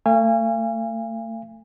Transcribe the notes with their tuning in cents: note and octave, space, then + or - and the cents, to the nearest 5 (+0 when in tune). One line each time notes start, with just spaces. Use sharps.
A3 +30 F5 -40 G#5 -30